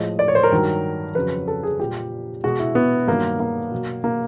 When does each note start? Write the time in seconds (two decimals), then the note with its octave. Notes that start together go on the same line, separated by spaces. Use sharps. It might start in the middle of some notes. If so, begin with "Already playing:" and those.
Already playing: A2 F3 G#3 D#5
0.19 D5
0.28 C#5
0.35 C5
0.43 A#4
0.52 G2 D#3 F#3
1.15 F2 C#3 F#3 B4
1.48 A4
1.63 G#4
1.80 A#2 G3 G4
2.44 B2 G#3 F#4
2.60 E4
2.75 B3
3.07 G2 D#3 F#3 A#3
3.40 A#3
3.71 B2 F#3
4.04 A#3